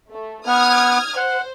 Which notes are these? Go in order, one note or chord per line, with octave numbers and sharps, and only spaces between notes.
A3
B3 D#6 F6 G#6
C5 F#5